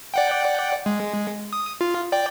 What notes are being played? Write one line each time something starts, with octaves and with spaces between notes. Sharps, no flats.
D5 F#5 G5
G#3
D#6
F4
D5 G5